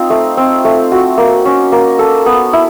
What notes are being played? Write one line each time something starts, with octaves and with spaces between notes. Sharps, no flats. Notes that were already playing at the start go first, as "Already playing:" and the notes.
Already playing: C4 D#4 F4
A3
C4
A3
F#4
A#3
C#4
A#3
A4
B3
E4